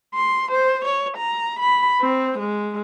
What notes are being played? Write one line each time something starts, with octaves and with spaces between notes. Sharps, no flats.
C6
C5
C#5
A#5
B5
C4
G#3